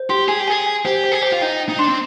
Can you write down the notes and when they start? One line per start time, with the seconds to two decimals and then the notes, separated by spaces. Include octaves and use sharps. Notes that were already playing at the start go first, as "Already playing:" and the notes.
Already playing: C5
0.09 G4 C6
0.28 G#4 G#5
0.40 G4
0.48 G#4 G#5
0.67 G#5
0.85 G4 C5
1.04 C5
1.12 G#4
1.22 G4 C5
1.32 F4
1.41 D#4 G5
1.60 G5
1.69 D#4
1.78 D4 C6
1.88 C4